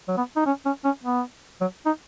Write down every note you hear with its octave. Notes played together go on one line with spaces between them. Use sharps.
F#3
B3
D#4
C#4
C#4
C#4
B3
F#3
D#4